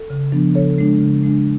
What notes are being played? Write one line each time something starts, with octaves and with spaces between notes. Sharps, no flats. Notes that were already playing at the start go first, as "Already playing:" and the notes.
Already playing: A4
C#3
F3 B3 D4
C#3 A4 C#5
G#3 D4
C#3
G#3 D4